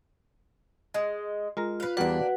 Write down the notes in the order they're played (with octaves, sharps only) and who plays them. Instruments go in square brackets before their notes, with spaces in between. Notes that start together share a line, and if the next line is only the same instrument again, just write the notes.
[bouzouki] G#3
[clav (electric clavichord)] G#3 A#4 A#5 [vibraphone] F4
[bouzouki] B4 F5
[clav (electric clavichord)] E2 G3 D5 [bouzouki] A#3 D4 [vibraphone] F#4 B4 F#5